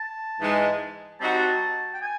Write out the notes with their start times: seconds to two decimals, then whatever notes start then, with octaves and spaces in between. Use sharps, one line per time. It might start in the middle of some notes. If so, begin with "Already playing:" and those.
Already playing: A5
0.40 G#2 E3 G#3
1.20 G3 C4 D#4 F#4 A5
1.93 G5
2.01 G#5